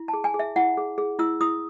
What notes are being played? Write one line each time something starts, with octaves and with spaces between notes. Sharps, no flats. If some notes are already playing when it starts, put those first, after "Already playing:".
Already playing: E4
A5
G#4
G#5
G#4
E5
E4 F#5
G#4
G#4
E4 E6
E4 D#6